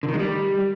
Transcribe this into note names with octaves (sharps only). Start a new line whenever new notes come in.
D3
D#3
G#3
G3